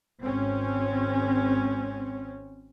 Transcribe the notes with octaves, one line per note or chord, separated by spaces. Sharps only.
G#1 C4 C#4